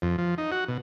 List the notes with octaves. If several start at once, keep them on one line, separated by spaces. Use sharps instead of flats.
F2
F3
D#4
F#4
B2